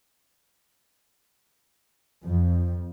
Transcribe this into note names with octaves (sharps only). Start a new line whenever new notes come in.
F2